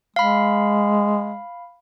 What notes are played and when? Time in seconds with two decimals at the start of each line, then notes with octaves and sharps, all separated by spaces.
0.16 G#3 F5 B5